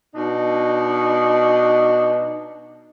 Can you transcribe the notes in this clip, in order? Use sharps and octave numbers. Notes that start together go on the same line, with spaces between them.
B2 D4 D#4